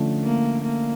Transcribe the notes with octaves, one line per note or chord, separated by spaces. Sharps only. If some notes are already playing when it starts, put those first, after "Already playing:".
Already playing: D3 F3 A3 C#4
A#3
A#3